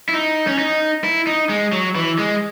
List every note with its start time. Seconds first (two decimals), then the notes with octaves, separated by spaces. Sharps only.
0.09 E4
0.14 D#4
0.47 C#4
0.58 D#4
1.04 E4
1.27 D#4
1.49 G#3
1.72 F#3
1.95 E3
2.18 G#3